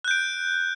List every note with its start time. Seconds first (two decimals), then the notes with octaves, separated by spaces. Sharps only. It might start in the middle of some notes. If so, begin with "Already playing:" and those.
0.04 F#6
0.08 G6
0.11 D7